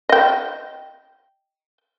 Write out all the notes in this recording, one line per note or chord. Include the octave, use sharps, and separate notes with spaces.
D#5 G5